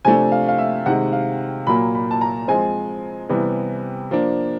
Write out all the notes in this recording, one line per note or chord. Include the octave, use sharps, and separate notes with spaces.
C3 F3 A3 D4 G#5
F5
F5
E5
C3 D#3 G#3 F#5
F5
A#2 F#3 A#3 B5
B5
A5
A#5
F3 G#3 C4 G#5
C3 E3 G3 B3
F3 A#3 D4